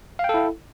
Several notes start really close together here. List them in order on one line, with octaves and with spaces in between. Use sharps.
F5 G5 A4 E4